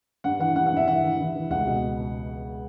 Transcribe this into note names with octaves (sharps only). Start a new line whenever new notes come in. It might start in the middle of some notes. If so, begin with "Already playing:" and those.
G2 F#5
E3 F#5
G2 F#5
F#5
G2 E5
E3 F#5
E3
E3
E3
C#2 F#5
B2